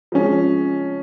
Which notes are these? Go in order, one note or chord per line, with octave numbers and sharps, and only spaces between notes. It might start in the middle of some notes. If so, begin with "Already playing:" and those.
F3 G#3 C#4